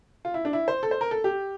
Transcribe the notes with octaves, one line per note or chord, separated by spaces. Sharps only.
F4
E4
D4
E4
C5
A4
C5
A#4
A4
G4